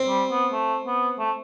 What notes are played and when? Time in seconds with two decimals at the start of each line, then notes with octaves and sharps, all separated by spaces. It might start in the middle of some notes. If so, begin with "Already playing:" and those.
Already playing: C4
0.08 G3
0.31 B3
0.53 A3
0.86 B3
1.19 A3